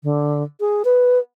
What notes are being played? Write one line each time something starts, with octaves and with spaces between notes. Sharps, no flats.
D3
G#4
B4